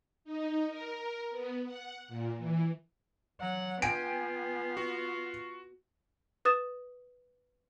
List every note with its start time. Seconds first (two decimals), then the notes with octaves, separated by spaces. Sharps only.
0.24 D#4
0.69 A#4
1.31 B3
1.66 F#5
2.08 A#2
2.37 E3
3.41 F#3 F#5
3.82 B3 F4 G5 G#5 D7
4.77 F#4
6.45 B4 D#6 A6 E7